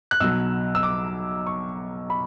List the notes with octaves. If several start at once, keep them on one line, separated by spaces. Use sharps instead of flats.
F#6
B1 B2 F#3 E6
E6
D6
C#6
B5